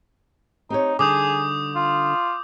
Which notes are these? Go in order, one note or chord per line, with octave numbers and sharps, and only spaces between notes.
C4 D#4 G4 C#5
D3 G3 D#4 G#4 D6 D#6 G6
F4